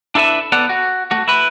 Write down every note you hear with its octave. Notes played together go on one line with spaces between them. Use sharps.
D4 E4 A4 B4 E5
B3 A4 D5 F#5
F#4
A3 F#4
E4 B4